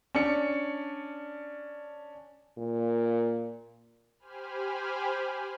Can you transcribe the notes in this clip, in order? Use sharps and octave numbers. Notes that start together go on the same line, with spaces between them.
C#4 D4 C#7
A#2
G4 C5 G#5 B5 F6